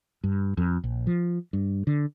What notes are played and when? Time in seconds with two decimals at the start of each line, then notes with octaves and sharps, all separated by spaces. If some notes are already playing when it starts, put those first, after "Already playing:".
0.24 G2
0.57 F2
0.84 A#1
1.07 F3
1.53 G2
1.87 D3